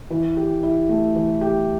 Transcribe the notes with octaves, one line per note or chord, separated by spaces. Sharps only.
E3
G4
E4
A3
E3
G4